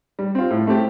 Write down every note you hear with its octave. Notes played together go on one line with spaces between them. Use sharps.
G3
C4 F4
A2
A3 C4 G4